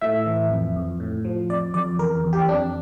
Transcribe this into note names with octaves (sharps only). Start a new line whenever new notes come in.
A2 E5
E3
F2
F2
A2
F3
F2 D5
F2 D5
E2 A#4
E2
G4
F2 D4